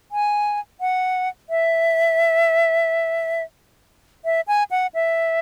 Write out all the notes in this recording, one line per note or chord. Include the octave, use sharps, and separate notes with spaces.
G#5
F#5
E5
E5
G#5
F#5
E5